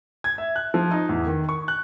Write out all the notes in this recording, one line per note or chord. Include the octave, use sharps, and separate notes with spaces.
G#6
E5
F#6
F3
D#4
E2
D#3
C#6
F#6